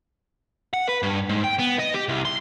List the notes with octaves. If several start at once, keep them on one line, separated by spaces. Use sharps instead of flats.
F#5
B4
G2
G#2
G5
B3
D#5
G4
C2
C6